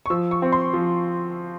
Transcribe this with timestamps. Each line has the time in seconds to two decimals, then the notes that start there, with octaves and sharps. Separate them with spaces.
0.06 C#6
0.10 F3 E6
0.31 C#6
0.42 C4
0.52 C6
0.73 F3